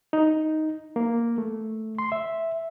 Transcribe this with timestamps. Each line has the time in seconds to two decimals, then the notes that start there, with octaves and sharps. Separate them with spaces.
0.13 D#4
0.96 A#3
1.38 A3
1.99 C6
2.12 E5